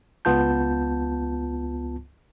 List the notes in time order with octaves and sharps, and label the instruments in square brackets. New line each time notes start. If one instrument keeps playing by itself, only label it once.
[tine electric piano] C#2 B3 F4 A5 G6